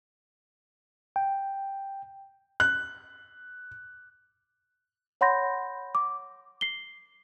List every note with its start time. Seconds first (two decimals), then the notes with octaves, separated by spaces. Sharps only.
1.16 G5
2.60 F#6
5.21 C#5 F#5 B5 C6 G6 A#6
5.95 D6
6.61 C7 G7